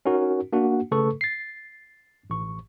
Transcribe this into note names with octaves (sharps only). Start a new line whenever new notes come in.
C#4 D#4 F#4 A#4
A#3 D4 F#4 F#5
C#3 A3 A4 B4 C#6
A6 C7
A1 C#6